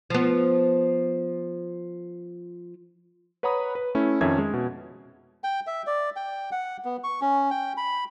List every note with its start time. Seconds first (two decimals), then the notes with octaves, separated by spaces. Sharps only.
0.10 F3 B3
3.43 B4 C#5 F#5 A#5 B5 D#6
3.75 B4
3.95 A3 C#4 E4
4.21 F2 D#3 C#4 C#5 E5 G#6
4.38 G#3
4.53 B2
5.44 G5
5.67 E5
5.87 D5
6.16 G5
6.52 F#5
6.85 B3
7.04 C#6
7.21 C#4
7.50 G5
7.77 B5